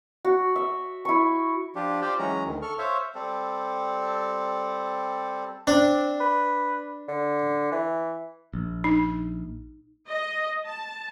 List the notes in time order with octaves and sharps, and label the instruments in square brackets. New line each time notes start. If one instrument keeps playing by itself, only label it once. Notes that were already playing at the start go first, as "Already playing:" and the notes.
[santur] F#4
E5
E4 C#6
[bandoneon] F3 D4 F4 G4
F4 G4 C5 D5 F5 G5
E3 F#3 G#3 C#4 A#5
D2 D#3
A4 C#6 F6
C5 C#5 E5 F5
[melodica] G3 C4 A4
[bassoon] C4 [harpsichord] D4
[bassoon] B4
D3
E3
[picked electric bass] A#1
[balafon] D#4
[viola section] D#5
A5